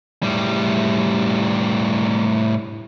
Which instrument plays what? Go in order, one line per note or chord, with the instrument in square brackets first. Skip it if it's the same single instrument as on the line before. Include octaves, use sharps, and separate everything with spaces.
[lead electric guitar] A2 G3